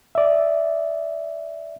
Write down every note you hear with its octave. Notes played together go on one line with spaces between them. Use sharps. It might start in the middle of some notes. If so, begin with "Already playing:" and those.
D5 E5